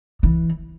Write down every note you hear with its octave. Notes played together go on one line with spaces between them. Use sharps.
E3